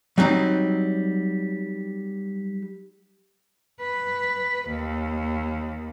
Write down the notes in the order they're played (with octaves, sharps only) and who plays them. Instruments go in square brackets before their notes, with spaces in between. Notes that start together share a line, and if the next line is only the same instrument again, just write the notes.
[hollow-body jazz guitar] F#3 G3 C4 D#4
[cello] B4
D#2